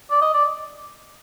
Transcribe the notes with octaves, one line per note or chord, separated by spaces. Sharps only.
D5
D#5
D5